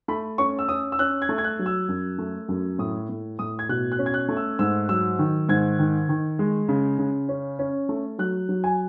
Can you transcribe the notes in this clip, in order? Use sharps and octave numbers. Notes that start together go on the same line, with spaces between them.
A3 B5
C#4 C#6
E6
C#4 D#6
E6
C#4 F#6
G#6
A3
G#6
F#6
F#3
E6
F#2
A3
F#2
A2 D#6
A2
A2 D#6
G#6
B2 F#6
F#6
C#4
G#6
F#6
A3
E6
G#2 E6
F#3 E6
D#3
G#2 G#6
D#3
D#3
G#3
C#3
C#3
C#4
C#4
A3
F#3 F#6
F#3
G#5